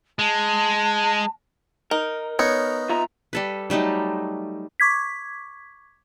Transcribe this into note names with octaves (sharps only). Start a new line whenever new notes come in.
G#3 A5
D#4 A#4
B3 D#4 C#5
F4 E5 A#5
G3 A4 B4
F#3 G3 A3 D#4
C#6 D6 G#6 B6